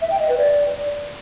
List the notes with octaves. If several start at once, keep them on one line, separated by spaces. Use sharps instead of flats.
E5
G5
D#5
B4
D5